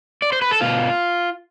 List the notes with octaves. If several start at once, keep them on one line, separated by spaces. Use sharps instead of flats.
D5
C5
B4
A4
B2 F4